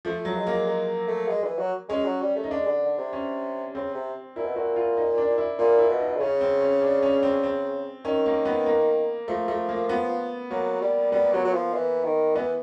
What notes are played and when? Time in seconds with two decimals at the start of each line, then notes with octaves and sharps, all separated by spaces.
0.05 F3 A3
0.25 F#3
0.36 G#3
0.47 A#3
0.67 G#3
1.08 A3
1.28 G#3
1.44 E3
1.58 F#3
1.89 G#3 C#4
2.05 F#3
2.21 G3
2.36 A3
2.44 D#4
2.51 G#3 D4
2.67 D3
2.83 D3
2.98 C3
3.13 C#4
3.75 C#3 C4
3.94 C3
4.36 A#2 E4
4.45 B2
4.56 A#2 F#4
4.76 F4
4.97 D#4
5.18 D4
5.38 E4
5.58 A#2 F4
5.79 E4
5.90 B2
6.00 D#4
6.15 D3
6.20 C#3 C#4
6.41 C4
6.61 C#4
6.82 D4
7.02 C#4
7.23 C4
7.43 C4
8.05 D#3 C#4
8.26 A#3
8.45 B3
8.66 A#3
9.28 F3 A3
9.48 A3
9.69 A#3
9.89 B3
10.50 F#3 A#3
10.82 G3
11.12 G3 B3
11.23 A#3
11.32 F#3 B3
11.45 F#3
11.53 F3
11.73 E3
12.04 D#3
12.35 E3 B3